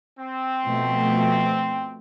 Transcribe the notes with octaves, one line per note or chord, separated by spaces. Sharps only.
C4
B2 F3 A3